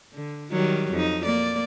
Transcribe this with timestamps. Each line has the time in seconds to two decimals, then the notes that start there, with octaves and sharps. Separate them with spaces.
0.14 D3
0.52 D#3 F#3 G3
0.92 F2 D#4
1.25 A#3 D5